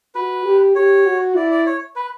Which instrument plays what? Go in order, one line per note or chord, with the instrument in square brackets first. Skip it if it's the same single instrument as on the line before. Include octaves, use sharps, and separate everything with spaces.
[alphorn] F#4 [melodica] B4
[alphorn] G4
[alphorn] G4 [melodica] C#5
[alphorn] F#4
[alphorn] E4 [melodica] D5
[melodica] D5
C#5
B4